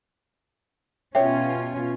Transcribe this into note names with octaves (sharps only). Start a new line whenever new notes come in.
B2 B3 C#4 F4 G4 C#5 E5 G5